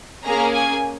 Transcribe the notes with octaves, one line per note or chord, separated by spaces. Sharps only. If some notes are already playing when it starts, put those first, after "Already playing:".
A#3 C#4 G#4 A#5
G#5